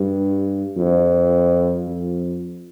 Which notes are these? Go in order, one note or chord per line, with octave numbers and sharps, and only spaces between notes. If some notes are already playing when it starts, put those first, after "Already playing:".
Already playing: G2
F2
F2